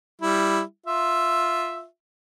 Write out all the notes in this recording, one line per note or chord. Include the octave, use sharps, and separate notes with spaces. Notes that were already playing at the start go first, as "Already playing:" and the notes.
G3 E4
F4 E5